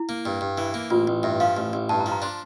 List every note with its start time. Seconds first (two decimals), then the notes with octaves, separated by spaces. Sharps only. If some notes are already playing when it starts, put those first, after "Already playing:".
Already playing: E4
0.09 A#3
0.25 G2
0.41 G2
0.58 E3
0.74 A#3
0.90 A1 F4
1.07 A1
1.23 G2 E5
1.40 F3 F5
1.57 A1
1.73 A1
1.89 G2 A5
2.00 A#5
2.06 F3
2.12 A#5
2.22 D4 C6